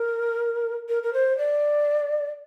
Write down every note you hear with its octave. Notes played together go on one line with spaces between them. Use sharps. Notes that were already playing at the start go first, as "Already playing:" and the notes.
Already playing: A#4
A#4
A#4
C5
D5